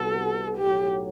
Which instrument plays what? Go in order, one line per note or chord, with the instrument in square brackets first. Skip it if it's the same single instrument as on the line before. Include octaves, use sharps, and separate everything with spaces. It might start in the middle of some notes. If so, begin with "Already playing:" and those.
Already playing: [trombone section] C2 C3 G3 B3 F#4 [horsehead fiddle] A4
[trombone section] B1 A2 F#3 [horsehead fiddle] G4